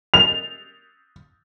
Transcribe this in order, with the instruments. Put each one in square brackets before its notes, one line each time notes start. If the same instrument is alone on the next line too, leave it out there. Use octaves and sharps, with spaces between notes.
[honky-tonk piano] F7